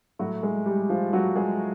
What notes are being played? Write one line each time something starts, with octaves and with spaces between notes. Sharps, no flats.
A2 F#3 F#4
G#3 G#4
G3 G4
F3 F4
F#3 F#4
G#3 G#4